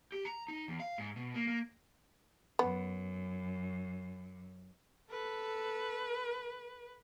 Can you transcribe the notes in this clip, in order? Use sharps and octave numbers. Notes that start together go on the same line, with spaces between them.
G4
A#5
D#4
E2
F5
G#2
B2
A#3
A#3
F#2 B3
A4 B4